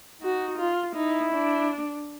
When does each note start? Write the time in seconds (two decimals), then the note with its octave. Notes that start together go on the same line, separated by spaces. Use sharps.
0.22 D#4 F#4
0.58 F4
0.95 D#4 E4
1.32 D4